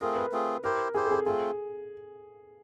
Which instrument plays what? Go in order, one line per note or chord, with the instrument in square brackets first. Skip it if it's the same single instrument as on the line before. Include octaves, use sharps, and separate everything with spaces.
[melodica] A3 C4 F4 G#4 [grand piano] A#4
[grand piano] B4
[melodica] A3 C4 F4 G#4
[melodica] E4 G4 C5 [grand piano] A#4
[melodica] E4 G4 C5 [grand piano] G#4
[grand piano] A4
G#4
[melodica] A3 C4 F4 [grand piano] G#4